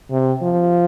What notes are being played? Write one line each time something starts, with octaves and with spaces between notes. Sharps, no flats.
C3
F3